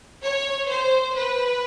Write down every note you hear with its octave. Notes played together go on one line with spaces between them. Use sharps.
C#5
C5
B4